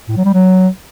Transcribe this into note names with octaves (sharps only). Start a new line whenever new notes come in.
A2
F#3
G3
F#3